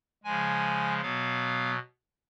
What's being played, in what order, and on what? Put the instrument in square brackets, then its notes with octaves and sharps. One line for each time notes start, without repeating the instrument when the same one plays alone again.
[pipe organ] C#3 F3 G#3 G#5
B2 F#3 B3 F5